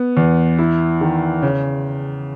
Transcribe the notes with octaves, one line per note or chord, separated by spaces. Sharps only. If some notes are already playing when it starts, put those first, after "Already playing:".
Already playing: B3
E2
E4
D#3
C#3